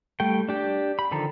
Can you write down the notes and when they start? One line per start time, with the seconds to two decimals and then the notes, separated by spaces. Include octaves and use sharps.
0.20 G3 A3 G5
0.49 D4 G4
0.99 B5
1.11 D3 D#3 F3 A4 A#5